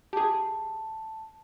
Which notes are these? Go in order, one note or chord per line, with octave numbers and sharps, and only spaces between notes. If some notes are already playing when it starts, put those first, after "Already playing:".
G4 G#4 A5